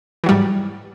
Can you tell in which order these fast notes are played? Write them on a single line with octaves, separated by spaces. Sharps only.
E3 F#3 G3 G#2